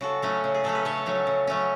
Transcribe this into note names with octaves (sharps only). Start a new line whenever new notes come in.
C#3 F#4 A4
F#3 A3 C#4
C#3
G#4
F#3 A3 C#4 A4
B4
C#3 A4 C#5
F#3 A3 C#4
C#3
F#3 A3 C#4